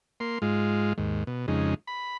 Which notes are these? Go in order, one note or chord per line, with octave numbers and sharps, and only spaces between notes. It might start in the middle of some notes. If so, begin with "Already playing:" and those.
A#3 C6
G#2 G#3 F4
D#2 G#2
B2
F2 C#3 G#3 D#4
B5